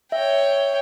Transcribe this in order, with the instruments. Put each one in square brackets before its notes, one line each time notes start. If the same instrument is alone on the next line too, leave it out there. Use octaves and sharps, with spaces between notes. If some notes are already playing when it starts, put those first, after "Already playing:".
[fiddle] C#5 G5 [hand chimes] E5